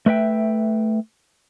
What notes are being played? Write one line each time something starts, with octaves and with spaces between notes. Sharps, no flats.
A3 B4 E5 G5